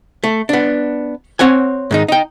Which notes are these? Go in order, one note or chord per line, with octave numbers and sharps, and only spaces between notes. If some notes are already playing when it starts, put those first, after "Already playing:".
A3
B3 D4
C4 C#5 F#5 G#5
G#2 D#3 D#4
D#4 G5